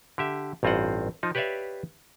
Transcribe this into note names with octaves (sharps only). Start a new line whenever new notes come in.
D3 G4 E5
A1 G2 C4 F4 C5 F#5
F3 D#4
G4 B4 C#5 D5 E5 F5